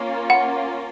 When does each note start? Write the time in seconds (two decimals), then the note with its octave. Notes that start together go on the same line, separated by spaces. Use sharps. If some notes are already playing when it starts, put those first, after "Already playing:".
Already playing: A#3 C#4 F4
0.30 F#5